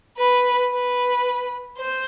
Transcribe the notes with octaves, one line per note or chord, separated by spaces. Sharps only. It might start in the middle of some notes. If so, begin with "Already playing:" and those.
B4
B4
C5